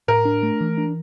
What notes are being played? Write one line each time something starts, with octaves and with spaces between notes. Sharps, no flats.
A2 A#4
D4
A3
E3
D4